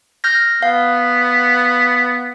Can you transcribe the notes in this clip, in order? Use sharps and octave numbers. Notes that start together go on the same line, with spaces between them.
F6 G6 A#6
B3 F5